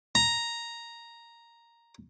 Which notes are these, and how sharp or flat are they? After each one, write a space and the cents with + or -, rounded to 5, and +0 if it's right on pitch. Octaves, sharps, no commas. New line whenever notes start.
A#5 +0